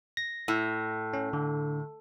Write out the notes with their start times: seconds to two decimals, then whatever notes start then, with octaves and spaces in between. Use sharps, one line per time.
0.17 A#6
0.48 A2
1.13 C#4
1.33 D3